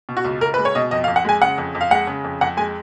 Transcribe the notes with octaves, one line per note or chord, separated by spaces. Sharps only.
B2
F#4
C#2
C#2 A#4
G#3 B4
C#5
B2 D#5
F2 D#5
F5
F2
F#5
G#3 G#5
C#3 F#5
F2
F2
F5
G#3 F#5
C#3
F2
F2 F#5
G#3 G#5